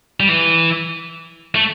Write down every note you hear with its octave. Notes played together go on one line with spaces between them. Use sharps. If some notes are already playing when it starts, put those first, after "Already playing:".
G3
E3
A3